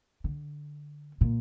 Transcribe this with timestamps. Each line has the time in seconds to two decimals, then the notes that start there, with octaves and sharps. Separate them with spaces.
0.24 D3
1.21 A#2